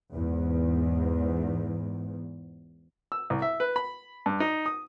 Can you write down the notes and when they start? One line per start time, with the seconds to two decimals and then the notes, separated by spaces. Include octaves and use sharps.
0.14 E2 G#2
3.12 E6
3.30 C2
3.42 E5
3.60 B4
3.76 B5
4.26 G2
4.40 D#4
4.66 D#6